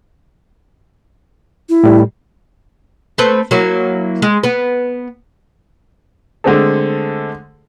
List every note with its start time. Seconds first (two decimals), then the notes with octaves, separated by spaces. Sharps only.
1.69 E4
1.84 A2 G3
3.18 A3 C4 B4
3.51 F#3 A#3 E4
4.22 G#3
4.43 B3 B4
6.44 D3 G#3 A3 C4 G#4 A4